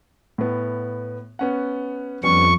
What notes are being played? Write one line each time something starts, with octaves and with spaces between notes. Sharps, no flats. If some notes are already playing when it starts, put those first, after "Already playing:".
A2 B3
B3 C#4 F#5
F2 G3 B3 C#4 C#6